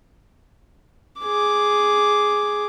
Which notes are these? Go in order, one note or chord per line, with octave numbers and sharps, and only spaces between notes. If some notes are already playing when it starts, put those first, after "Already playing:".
G#4 D6